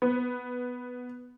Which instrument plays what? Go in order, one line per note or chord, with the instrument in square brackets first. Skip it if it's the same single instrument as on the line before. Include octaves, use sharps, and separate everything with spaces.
[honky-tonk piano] B3